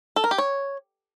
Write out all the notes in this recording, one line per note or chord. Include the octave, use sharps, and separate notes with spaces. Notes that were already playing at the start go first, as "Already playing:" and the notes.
A4
A#4
G4
C#5